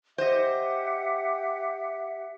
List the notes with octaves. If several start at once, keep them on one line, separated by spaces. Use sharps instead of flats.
G4 C5 D#5 E5 F#5